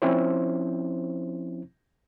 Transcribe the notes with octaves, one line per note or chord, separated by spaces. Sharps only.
F3 C4 C#4 E4 C5